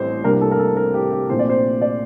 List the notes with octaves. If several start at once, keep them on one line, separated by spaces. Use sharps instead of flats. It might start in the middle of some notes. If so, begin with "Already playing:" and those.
Already playing: A1 A2 G3 C4 C5
C2 C3 G3 A#3 D4 A#4
A4
A#4
A4
A#4
G4
G4
A#1 A#2 A3 C4 C5
D5
C5
D5